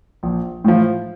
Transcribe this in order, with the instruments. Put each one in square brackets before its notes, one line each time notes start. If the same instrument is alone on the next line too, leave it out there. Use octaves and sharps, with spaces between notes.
[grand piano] A#1
A2 F3